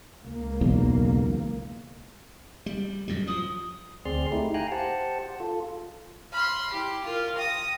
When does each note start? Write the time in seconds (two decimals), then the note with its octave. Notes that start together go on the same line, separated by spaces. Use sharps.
0.25 C#2 A#3
0.61 B1 E2
2.66 G3
3.08 F#2 A2 G3
3.27 F3 D#6
4.05 D2 C4 G#4 D5 C6 F6
4.32 A3 D#4 E4 G4
4.54 F5 G5 G#5 A#5 F#6
4.72 G4 C5 F#5 A5
5.40 F4 A4
6.32 B5 C6 F6
6.71 E4 G4
7.05 F4 A#4
7.37 G5 D#6 A#6